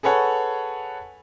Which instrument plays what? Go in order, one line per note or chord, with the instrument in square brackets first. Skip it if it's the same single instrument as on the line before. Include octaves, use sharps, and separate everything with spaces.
[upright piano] G#4 A4 B4 C#5 F#5